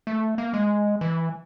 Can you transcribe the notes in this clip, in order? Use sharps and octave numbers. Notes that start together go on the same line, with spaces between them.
A3
A#3
G#3
E3